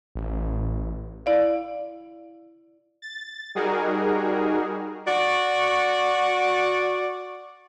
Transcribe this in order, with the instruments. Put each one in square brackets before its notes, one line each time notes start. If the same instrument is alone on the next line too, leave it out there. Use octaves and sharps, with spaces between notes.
[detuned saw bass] A1
[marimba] E4 D5 F5
[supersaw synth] A6
G3 D#4 F#4 G#4 A#4
[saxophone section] F#4 D5